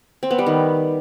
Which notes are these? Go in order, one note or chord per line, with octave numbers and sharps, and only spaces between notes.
C4
B3
G3
D#3